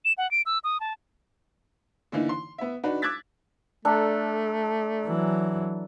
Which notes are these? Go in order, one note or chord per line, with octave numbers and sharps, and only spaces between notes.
E7
F#5
D7
E6
D#6
A5
D3 E3 A#3 D#4
C6
B3 E5
D4 D#4 F#4 B4
D6 E6 F#6 G#6 A6 B6
A3 D4 A4 A#5
E3 F#3